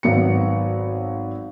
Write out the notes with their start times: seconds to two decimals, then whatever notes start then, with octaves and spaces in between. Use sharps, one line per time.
0.03 G#1 F#3 B3 C#7